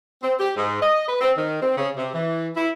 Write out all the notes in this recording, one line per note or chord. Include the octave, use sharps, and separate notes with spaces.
C4
G4
G#2
D#5
B4
C4
D#3
C4
C#3
C3
E3
E4